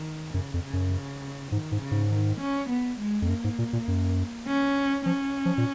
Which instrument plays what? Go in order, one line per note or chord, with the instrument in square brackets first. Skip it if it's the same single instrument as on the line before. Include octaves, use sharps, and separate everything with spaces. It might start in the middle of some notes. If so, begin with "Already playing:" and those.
Already playing: [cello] D#3
[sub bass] F#2 [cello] C#3
[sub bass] F2
[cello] C#3
[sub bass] F#2
[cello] C#3
[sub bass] G#2 [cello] D#3
[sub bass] G#2
[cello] C#3
[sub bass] G#2
[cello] D#3
C#4
B3
G#3
[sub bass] F2
[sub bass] F#2 [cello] A#3
[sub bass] G#2
A#2
A#2
F#2
[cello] C#4
[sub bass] F3 [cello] C#4
[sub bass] F3
A#2